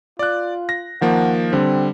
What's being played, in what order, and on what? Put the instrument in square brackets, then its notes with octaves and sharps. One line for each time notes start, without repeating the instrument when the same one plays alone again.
[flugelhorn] F4 [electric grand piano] D5 F#6
[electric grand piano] A#6
[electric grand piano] D#3 F3 A#3 [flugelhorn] F#5
[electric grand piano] D3 G3 [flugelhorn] C4